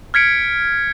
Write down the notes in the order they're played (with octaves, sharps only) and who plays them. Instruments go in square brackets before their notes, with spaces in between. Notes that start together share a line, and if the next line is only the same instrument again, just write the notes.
[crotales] F6 G#6 B6 C#7 D7